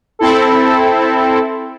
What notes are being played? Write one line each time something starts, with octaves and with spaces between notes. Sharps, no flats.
C4 E4 A4